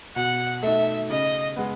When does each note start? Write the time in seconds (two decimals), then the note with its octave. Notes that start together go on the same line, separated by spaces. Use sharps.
0.16 B2 F#5
0.63 A3 D#4 E5
1.10 C#3 D#5
1.56 G#3 B3